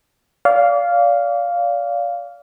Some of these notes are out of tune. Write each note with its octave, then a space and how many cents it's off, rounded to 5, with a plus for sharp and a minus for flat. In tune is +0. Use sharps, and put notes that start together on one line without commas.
D5 -35 F5 +0